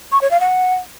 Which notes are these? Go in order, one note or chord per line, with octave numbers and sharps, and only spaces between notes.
C#6
C#5
F5
F#5